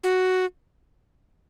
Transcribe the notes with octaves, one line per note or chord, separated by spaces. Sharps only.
F#4